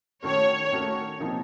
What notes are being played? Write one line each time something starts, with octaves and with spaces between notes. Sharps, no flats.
D#3 A3 C#4 F#4 A#4 C#5
D#3 A3 C#4 F#4 A#4
C3 F3 A#3 D#4